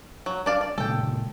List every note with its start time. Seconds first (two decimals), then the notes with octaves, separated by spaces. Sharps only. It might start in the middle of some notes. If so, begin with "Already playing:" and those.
0.26 F#3
0.46 D4 D5 F5
0.61 D5
0.78 A#2 C#3 G#3 A4 G5